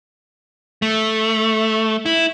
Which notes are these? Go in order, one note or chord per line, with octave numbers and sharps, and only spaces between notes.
A3
E4